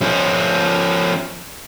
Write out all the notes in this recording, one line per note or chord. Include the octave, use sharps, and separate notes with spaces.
F3 C#4